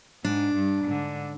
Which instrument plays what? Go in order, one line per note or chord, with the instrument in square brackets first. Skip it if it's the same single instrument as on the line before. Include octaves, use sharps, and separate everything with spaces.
[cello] G#2 [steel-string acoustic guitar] D4
[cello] G2
G#2 D3